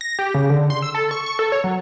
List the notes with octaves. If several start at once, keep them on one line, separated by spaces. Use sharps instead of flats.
A#6
G4
C#3
D3
C6
E6
A4
C#6
C#6
A4
C#5
F#3